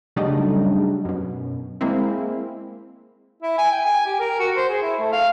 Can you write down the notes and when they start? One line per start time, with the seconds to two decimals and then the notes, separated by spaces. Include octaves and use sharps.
0.16 C#3 F#3 G3 A3 D4 D#4
1.05 F#2 B2
1.81 G#3 A#3 C4 E4
3.42 E4
3.58 G#5
3.72 G5
3.85 G#5
4.06 G4
4.20 A#4
4.39 F#4
4.56 C5
4.69 G#4
4.82 E4
4.99 A3
5.12 F5